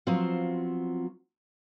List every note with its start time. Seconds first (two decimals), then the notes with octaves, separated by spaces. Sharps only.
0.07 F3 F#3 B3 C4 F4